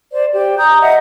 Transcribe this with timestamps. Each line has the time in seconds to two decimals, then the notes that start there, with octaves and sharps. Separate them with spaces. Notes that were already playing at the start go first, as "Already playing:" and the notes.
0.11 C5 D5
0.33 G4 D5
0.57 A#5 D#6 G6
0.80 D#5 E5 F#5